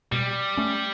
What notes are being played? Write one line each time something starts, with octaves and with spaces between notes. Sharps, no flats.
B2 G3
A3 C#4